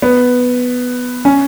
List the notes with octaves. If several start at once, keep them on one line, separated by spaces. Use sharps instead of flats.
B3
C#4